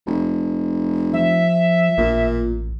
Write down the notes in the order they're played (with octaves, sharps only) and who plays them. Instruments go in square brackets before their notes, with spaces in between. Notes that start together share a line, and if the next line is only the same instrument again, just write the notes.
[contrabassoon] F1
[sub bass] F3 [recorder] E5
[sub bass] A1 [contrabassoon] A#2